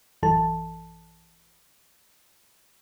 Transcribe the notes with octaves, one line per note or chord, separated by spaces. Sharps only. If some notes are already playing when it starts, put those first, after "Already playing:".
A1 F#2 E3 A4 A5